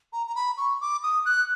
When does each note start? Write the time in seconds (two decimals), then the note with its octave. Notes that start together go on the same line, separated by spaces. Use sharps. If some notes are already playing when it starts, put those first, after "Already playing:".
0.13 A#5
0.27 A#5
0.36 B5
0.57 C#6
0.81 D6
1.03 D#6
1.26 F#6